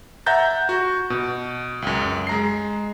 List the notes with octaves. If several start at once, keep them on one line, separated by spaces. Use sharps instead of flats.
E5 F#5 A#5 G6 A6
F#4
B2
C#2 F#2
G#3 A#5 C7